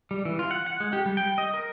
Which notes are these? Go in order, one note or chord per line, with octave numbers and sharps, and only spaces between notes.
G3
E3
F4
F#5
F#5
G#3
G4
G3
G5
D#5
A#4